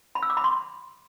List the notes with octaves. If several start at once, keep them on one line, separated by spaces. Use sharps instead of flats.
B5
E6
D6
B5
C6